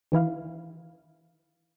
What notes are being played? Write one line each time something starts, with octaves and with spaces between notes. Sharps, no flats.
D#3 E3 E4 F5